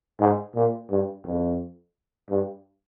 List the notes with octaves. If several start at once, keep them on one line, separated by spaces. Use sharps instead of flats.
G#2
A#2
G2
F2
G2